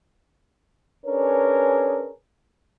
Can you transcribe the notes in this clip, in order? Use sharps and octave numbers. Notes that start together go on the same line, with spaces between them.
C#4 D4 G#4 A#4 B4 C#5